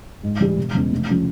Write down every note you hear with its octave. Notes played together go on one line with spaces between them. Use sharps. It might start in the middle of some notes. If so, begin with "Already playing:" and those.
G#2
E3 G3
E1
E2 C#3 E3
F1
C#3 F3